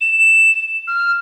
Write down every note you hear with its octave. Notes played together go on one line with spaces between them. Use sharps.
E7
F6